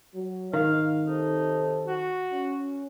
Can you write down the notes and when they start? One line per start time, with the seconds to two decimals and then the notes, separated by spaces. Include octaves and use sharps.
0.15 F#3
0.54 G#2 D#3 F5
1.05 C3 C4 D#4 A4
1.88 F#4
2.33 C#4